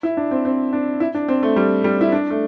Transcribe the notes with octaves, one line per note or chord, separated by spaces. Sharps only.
E4
D4
C4
C4
D4
E4
D4
C4
A3
G3
G3
E4
D4
A3